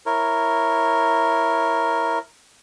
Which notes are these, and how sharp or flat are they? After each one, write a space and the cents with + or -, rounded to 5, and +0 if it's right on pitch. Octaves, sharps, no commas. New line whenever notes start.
E4 +0 A#4 +0 C#5 -10